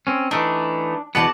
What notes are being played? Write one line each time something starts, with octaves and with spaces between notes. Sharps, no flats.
C4 C#4
E3 A3 D4 D#4
E2 B2 B3 F#4 D5 A5